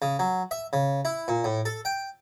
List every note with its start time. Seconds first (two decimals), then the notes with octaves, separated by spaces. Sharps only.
0.02 C#3
0.19 F#3
0.51 E5
0.73 C#3
1.05 E4
1.28 A#2
1.44 A2
1.65 A4
1.85 G5